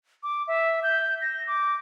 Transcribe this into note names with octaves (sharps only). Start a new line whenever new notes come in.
D6
E5
G6
A#6
D6